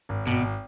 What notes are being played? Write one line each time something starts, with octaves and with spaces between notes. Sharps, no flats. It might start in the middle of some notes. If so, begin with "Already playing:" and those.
G#1
G#1 B2